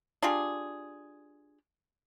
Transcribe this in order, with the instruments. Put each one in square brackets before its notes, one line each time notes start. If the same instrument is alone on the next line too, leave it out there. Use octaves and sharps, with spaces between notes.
[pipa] D4 F4 G4 G#4